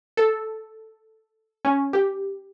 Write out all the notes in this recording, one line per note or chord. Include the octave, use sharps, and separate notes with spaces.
A4
C#4
G4